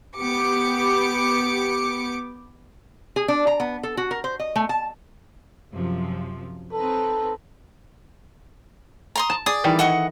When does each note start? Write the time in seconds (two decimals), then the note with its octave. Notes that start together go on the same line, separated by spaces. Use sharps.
0.17 B3 G4 D6 C#7
3.16 G#4
3.28 D4
3.47 A#5
3.60 B3
3.83 A4
3.97 F#4
4.11 A#4
4.24 C5
4.40 D#5
4.56 A3
4.69 A5
5.72 F#2 C3 F3
6.73 C4 D#4 A4 B4
9.16 A#5 C6 D#6
9.30 A5
9.46 G#4 D5 D#6
9.64 D#3 E3 G3
9.79 A4 D#5 F#5 C#6